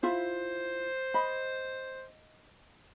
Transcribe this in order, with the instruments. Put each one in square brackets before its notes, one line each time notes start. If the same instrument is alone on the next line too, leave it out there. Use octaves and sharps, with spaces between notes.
[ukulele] E4 F4 E5 [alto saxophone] C5
[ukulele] D#5 B5